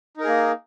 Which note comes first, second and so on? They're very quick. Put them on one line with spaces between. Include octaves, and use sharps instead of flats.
D#4 A#4 G#4 A#3